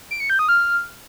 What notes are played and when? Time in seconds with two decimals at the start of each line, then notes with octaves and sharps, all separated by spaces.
0.11 D7
0.20 C#7
0.30 G6
0.39 D#6
0.49 F6